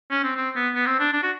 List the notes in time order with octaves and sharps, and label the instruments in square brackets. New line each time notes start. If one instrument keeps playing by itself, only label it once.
[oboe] C#4
C4
C4
B3
B3
C4
D4
D4
F#4